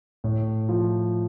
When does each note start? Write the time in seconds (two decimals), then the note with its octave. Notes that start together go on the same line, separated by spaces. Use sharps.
0.24 A2
0.69 F3